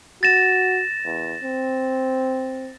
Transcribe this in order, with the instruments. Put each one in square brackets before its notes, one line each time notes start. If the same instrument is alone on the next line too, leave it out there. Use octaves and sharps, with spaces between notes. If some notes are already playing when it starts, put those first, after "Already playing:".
[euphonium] F#4 [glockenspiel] A6 A#6 E7
[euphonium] E2
C4